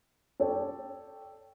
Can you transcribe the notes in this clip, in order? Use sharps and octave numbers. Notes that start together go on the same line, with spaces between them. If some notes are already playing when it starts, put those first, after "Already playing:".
A4 C#5 D5 G5